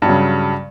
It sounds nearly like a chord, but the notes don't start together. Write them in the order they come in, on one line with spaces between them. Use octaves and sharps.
G2 F#3 C#3